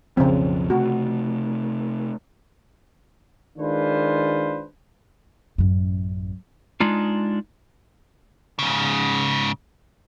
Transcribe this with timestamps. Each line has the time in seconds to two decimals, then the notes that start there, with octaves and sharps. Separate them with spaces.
0.17 B1 F2 C#3 F3 C4
0.70 C3 A3 F#4
3.58 D#3 G#3 D4 F4 B4 C5
5.58 A1 F#2
6.80 G#3 D4 D#4 F4
8.59 G#2 C#3